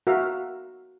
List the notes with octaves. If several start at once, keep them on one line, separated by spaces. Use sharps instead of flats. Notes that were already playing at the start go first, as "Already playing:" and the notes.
F#4 A#4 E5 F5